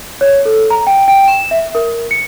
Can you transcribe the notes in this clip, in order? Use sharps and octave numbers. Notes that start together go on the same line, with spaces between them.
C#5
A4
A#5
G5
G5
E7
E5
A#4
C#7